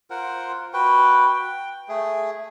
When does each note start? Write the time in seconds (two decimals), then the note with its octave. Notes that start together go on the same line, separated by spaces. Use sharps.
0.10 F4 A#4 C5 F#5
0.73 F#4 B4 G5
1.27 G5
1.88 A3 G#4